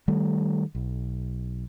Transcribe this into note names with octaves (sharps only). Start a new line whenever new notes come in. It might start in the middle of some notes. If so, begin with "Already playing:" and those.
D#3 G3 A3
B1